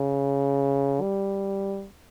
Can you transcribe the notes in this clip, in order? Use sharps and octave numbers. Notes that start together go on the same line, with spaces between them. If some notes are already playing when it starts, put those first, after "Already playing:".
Already playing: C#3
G3